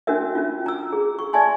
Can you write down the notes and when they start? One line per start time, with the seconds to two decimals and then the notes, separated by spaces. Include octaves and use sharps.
0.07 C#4 D4 F#4 A#4 E5
0.35 C#4 F4
0.66 A#5 E6
0.93 G#4
1.19 C#6
1.33 D5 E5 G#5 A5 C6